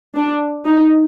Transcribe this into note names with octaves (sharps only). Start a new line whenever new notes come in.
D4
D#4